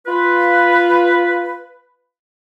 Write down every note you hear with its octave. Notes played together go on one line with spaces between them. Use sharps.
F4 B4